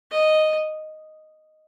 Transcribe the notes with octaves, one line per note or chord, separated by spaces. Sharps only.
D#5